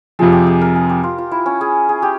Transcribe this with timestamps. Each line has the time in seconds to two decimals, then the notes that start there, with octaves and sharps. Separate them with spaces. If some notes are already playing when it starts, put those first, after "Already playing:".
0.19 F2 C3 F3 G#4
0.32 G4
0.47 G#4
0.61 A#4
0.76 G#4
0.90 G4
1.03 F4
1.18 F4
1.31 E4
1.46 C#4
1.61 G#4
1.89 G#4
2.02 G4